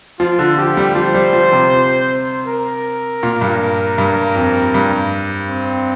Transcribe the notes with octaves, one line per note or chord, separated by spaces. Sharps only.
F3 F4
D3
F3 G4
G3
F3 C5
G3
F3
C3
A#4
A#2
G2
G2
F2
G2
C4